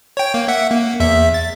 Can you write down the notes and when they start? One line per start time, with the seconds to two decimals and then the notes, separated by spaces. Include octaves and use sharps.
0.17 C#5 G5
0.34 A#3
0.48 E5 F#5
0.71 A#3
1.00 E2 E5
1.34 A6